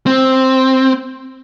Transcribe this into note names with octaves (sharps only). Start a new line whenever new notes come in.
C4